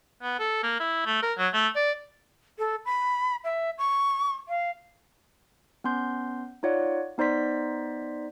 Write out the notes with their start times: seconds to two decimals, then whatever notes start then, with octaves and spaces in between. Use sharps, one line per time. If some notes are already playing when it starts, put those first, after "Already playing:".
0.23 B3
0.39 A4
0.63 A#3
0.80 E4
1.06 A3
1.23 A#4
1.38 F#3
1.53 A3
1.76 D5
2.59 A4
2.85 B5
3.44 E5
3.78 C#6
4.49 F5
5.84 B3 C#4 C6 G6
6.63 D#4 F4 C#5 D5 F#5
7.18 B3 D#4 C5 D5 C6 B6